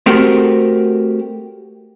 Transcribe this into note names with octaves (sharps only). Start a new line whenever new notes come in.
A3 C4 F#4 G4 A4 A#4